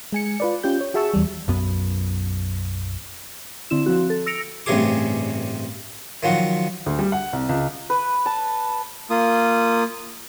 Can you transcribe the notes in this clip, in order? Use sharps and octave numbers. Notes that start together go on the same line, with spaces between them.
G#3 G#5 C#7
F4 B4 D5
C#4 F4 G4 G6
C#5
F#4 G#4 E5 A5 C#6 E6
E2 G3
B1 F#2 B3
D3 C4 E4 E7
F3 C4 F#4
A4
E6 A#6 C#7 D7 F7
A1 G2 C3 C#4 G#4 D6
D#3 F3 F#3 F#4
D2
G3
F#5
C2
C#2
B4
A5
A#3 F4 D#6